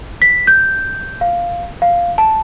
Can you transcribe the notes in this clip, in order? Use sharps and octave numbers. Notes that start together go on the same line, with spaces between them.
B6
G6
F5
F5
A5